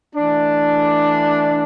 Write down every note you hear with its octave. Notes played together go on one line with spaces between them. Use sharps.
E3 A3 D4